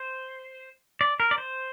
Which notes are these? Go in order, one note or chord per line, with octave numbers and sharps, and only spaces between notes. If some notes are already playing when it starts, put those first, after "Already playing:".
Already playing: C5
D5
A#4
D5
C5